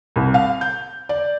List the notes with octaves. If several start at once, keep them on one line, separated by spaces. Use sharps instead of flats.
C2
F5
G6
D5